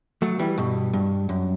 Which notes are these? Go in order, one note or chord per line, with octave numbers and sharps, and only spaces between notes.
F#3 A3
E3 G3
G2 B2
G2
F#2